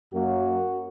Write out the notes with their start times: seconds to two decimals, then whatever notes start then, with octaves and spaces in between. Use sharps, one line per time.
0.13 F#2 F#3 A#3 F#4